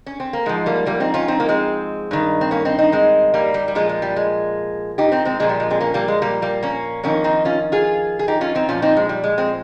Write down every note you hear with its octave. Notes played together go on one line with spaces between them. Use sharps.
C#4
C4
A#3
G#2 F3 G#3
G3 A#3
G3 A#3
C4 D#4
C#4 F4
C4 D#4
A#3
G#3 C4
G2 D#3
C4
A#3 C#4
C4 D#4
C4 D#4
G#3 C4
G3 A#3
G3
G3
A#2 F3 G#3
G#3
G3
G#3
D#4 G4
C4 D#4
G#3 C4
A#2 F3 G#3
G3
G#3
G#3 C4
A#3 C#4
G3 A#3
G#3
G3 A#3
G3 A#3
A#3 C#4
F2 D#3 A#3 C#4
C4 D#4
C#4 F4
F4 G#4
G#4
D#4 G4
C#4 F4
C4 D#4
A#2 F3 C#4 F4
C4 D#4
G#3
G3
G#3
G#3 C4